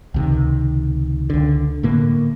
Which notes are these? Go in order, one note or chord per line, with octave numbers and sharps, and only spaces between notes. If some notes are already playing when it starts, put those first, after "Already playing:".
C#2 C3 D#3
C#2 D3
A2 D3 A#3